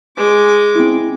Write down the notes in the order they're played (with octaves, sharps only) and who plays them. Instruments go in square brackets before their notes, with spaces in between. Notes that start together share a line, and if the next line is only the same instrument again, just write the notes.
[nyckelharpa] G#3 D6
[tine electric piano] C4 E4